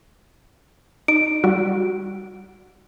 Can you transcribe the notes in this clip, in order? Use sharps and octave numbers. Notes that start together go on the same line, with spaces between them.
D#4 D7
G3 F#4